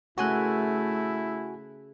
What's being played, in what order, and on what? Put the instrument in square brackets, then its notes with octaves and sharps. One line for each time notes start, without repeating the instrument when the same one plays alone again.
[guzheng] C#3 A#4 C6 [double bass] A3 [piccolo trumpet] E4 [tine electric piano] F#4 G#5 F#6